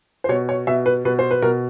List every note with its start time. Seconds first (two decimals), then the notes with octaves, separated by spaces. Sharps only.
0.24 C5
0.29 B2 C#5
0.49 C#5
0.67 B2 E5
0.86 B4
1.05 B2 B4
1.19 C5
1.31 B4
1.42 B2 A#4